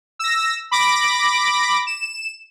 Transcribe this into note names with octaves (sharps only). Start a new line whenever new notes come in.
E6 A#6
B5 D6 A#6 D7
E7